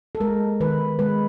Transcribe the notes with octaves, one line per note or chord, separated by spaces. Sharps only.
A4
G#3 A#4
D#3 B4
G#3 B4